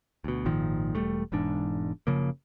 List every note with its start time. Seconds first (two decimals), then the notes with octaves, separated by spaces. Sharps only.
0.24 D2 B2
0.45 G#1 A#2 D#3 F3
0.95 E1 F#2 G3 A3
1.32 E1 E2 G#2 D4
2.07 F#1 C#3 F3 A#3